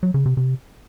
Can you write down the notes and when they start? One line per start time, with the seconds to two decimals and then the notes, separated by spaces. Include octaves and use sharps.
0.03 F#3
0.14 C#3
0.26 C3
0.37 C3